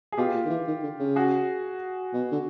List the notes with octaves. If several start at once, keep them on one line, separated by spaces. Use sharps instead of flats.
G#4
B2 F4 G4
A#2
D#3
E3
D#3
D3
C#3
F#4 G#4
B2
D3